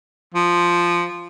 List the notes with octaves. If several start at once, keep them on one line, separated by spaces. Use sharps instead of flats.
F3